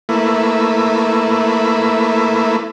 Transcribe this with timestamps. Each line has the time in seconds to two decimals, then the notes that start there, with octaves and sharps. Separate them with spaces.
0.09 A3 A#3 E4 B4